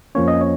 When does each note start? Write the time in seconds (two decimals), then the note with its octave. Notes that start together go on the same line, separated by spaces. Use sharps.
0.15 F2 F3 A#3 C#4 C#5
0.28 D#5
0.41 C#5